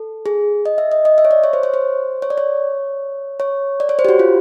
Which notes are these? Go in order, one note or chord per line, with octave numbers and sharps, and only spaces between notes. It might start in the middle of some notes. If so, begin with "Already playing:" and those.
Already playing: A4
G#4
D#5
E5
D#5
D#5
E5
C#5
D5
C#5
C5
C#5
C5
C#5
D5
C#5
C#5
D5
C#5
C5
G4
F#4
F4